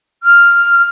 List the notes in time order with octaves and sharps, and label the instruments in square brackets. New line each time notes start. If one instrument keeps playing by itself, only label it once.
[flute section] F6